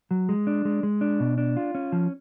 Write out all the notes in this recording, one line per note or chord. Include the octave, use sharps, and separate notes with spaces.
F#3
G#3
D4
G#3
G#3
D4
B2
D4
F4
C#4
F3